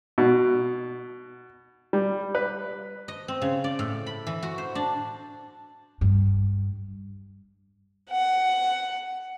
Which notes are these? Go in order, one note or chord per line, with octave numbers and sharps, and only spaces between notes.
B2
G3
B4
D#5
C4
C#3
D5
A2
B5
E3
F#4
C5
D4
G2
F#5